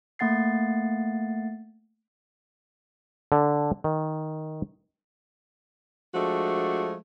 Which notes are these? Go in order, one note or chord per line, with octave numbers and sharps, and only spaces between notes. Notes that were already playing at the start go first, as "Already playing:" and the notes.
A3 A#3 F#5 A6 C7
D3
D#3
F3 G#3 A3 D4 F#4